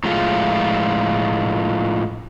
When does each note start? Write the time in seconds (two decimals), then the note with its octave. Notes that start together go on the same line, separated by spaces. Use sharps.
0.04 A2 F3 G#3 A3 F4